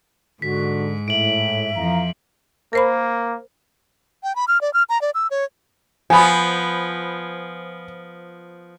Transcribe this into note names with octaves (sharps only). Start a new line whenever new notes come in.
G#2 D3 F#4 B6
A2 E5 D7 F#7
F2 E3 F3 F5 A#5
A#3 A#4 C5 B5
G5
B5
F6
D5
F6
A#5
D5
E6
C#5
F3 B3 G#5 B5